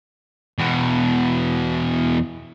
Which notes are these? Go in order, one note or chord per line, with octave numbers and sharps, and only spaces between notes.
E2 B2